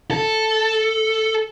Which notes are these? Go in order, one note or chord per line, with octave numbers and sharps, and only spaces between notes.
A4